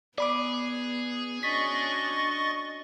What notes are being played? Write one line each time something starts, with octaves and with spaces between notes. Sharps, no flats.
B3 G#4 D5 B5 D6
C#4 D4 F#4 D#5 C#6 A6 B6